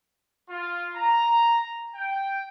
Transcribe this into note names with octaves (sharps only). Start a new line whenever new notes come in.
F4
A#5
G5